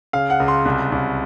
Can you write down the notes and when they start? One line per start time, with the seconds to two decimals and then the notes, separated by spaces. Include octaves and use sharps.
0.13 C#3 F5
0.30 F#5
0.40 C#2
0.48 C6
0.65 C2
0.92 C2